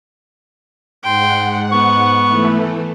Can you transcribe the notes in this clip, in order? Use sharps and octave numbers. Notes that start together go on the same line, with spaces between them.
G#2 F#5 G5 C6
B3 C#6
E3 A3